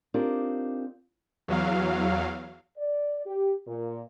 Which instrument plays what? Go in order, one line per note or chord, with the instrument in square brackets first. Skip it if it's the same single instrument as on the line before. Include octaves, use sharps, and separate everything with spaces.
[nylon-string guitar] C4 D4 D#4 F4 G4 A#4
[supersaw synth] E2 F#3 F5
[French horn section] D5
G4
A#2